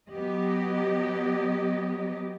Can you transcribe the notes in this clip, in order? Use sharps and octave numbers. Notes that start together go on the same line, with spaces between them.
F#3 B3 G4 D#5